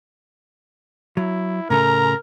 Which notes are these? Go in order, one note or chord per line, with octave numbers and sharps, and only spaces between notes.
F#3 E4
A2 C#3 A3 A#4 A#5